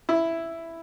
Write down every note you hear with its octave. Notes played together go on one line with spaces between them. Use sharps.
E4